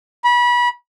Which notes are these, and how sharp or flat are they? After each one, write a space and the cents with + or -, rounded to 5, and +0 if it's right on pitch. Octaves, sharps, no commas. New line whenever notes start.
B5 -30